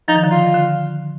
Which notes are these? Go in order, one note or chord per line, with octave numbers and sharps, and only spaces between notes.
F3 D#4
D#3
D3 F3
F4
D3